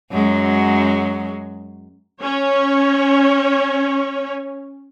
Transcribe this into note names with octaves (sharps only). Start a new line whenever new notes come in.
F#2 F#3 G#3
C#4 C#5